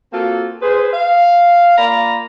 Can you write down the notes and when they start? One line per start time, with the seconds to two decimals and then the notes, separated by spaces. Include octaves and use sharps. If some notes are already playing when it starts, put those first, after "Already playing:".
0.13 A#3 C4 F4 F#4 A4
0.62 G#4 B4 C5
0.93 F5
1.78 A#3 F4 D5 A#5 B5